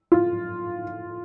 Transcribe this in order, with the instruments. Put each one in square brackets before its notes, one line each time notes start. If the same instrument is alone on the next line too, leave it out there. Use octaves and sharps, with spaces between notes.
[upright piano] F4